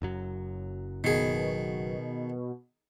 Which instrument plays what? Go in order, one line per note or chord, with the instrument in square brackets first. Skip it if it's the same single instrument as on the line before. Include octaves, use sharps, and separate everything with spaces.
[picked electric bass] F#1 F#2 F#3
[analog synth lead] B2 [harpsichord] D#3 G#4